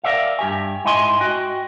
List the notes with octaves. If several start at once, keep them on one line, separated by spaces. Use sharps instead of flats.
A#4 B4 D5 E5 F5
G2 G4 G#5
G#2 E4 D#5 G#5 C6
F#4 D#5 G5